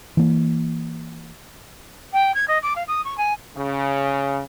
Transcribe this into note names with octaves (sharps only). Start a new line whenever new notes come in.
E3 A#3
G5
G#6
D#5
D6
F5
D#6
C#6
G#5
C#3